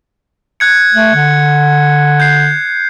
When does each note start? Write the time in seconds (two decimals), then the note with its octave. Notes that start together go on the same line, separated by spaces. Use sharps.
0.60 F#6 G#6 C#7
0.94 A3
1.14 D3
2.20 G6 C7